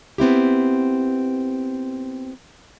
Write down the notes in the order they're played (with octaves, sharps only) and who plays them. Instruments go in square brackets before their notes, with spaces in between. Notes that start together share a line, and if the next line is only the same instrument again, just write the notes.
[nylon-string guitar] B3 C4 E4 G4